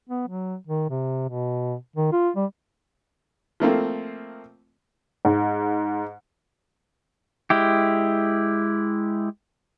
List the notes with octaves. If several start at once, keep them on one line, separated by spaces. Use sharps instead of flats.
B3
F#3
D#3
C3
B2
D#3
F4
G3
F3 A3 A#3 C4
G#2
G#3 E4 G4